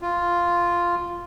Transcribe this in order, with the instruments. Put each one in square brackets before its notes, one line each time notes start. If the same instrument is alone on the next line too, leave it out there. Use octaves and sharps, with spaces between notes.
[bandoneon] F4